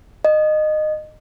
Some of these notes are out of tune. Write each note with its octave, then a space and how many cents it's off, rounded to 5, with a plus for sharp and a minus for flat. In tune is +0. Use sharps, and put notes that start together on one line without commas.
D#5 -20